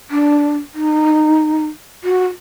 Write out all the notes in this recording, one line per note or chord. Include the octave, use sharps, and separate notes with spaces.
D4
D#4
F#4